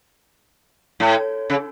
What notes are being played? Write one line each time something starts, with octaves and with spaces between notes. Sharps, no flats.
A2
C#3